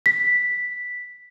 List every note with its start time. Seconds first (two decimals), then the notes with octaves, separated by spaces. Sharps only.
0.06 B6